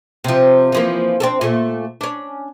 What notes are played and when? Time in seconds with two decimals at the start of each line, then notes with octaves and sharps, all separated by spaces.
0.24 C3 F3
0.72 E3 F3 A#3
1.20 C4 D4 A4
1.41 A#2 A3
2.01 C#4 D4